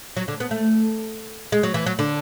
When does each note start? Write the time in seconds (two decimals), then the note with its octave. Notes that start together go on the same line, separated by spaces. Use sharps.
0.17 F#3
0.28 D3
0.40 B3
0.51 A3
1.52 G#3
1.63 F#3
1.74 E3
1.86 F#3
1.99 D3